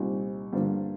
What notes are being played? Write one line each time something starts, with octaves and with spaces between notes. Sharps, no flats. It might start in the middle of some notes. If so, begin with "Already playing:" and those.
Already playing: C2 A#2 G3 C4 D#4
G2 D3 F3 A#3